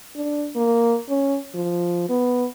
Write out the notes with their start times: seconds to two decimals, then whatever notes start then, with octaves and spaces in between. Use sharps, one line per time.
0.16 D4
0.56 A#3
1.09 C#4
1.55 F3
2.09 B3